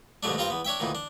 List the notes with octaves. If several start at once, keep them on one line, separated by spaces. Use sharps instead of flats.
D#2 G#2 B2 F#3 A3 D4
G2 C4 F4 A#4 C5 A#5
E2 B3
D4 C#5 E5 G5
D2 A#2 D#3 E3
D4